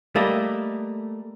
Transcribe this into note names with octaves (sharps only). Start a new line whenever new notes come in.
G3 A3 A#3 D#5